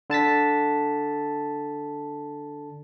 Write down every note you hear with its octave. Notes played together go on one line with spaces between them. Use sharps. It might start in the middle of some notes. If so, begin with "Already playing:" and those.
D3 A5 A6 B6